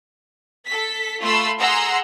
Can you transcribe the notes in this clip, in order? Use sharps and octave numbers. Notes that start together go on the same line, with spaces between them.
A4 B6
A3 F4 B5 C6 E6
G#4 F#5 A#5 C6 E6